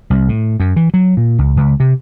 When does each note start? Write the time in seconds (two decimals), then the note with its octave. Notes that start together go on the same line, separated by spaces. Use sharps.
0.10 C2
0.29 A2
0.60 F#2
0.76 E3
0.94 F#3
1.17 A#2
1.38 C#2
1.57 C#2
1.80 C3